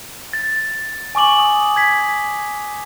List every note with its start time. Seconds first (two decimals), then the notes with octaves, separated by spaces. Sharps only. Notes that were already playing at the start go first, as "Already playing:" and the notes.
0.33 A6
1.15 G#5 C#6 D6 F#7
1.39 D#6
1.76 G#6 B6